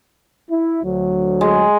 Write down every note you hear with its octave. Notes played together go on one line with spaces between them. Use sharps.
E4
D2 F#3
G#3